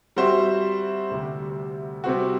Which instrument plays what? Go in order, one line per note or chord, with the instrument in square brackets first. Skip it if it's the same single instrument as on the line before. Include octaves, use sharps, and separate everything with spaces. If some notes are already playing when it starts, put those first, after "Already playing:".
[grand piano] G3 C4 F#4 C5 E5
D2 C3 G3
C3 G3 C4 F#4